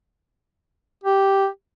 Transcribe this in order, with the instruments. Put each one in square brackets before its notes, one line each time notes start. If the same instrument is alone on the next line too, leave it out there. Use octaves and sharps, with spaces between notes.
[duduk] G4